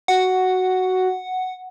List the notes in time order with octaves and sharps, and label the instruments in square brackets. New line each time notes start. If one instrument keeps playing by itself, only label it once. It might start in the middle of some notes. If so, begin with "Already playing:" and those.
[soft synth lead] F#4 [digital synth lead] F#5